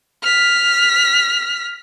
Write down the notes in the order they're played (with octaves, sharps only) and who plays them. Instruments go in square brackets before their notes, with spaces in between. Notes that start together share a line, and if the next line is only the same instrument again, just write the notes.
[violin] F6 B6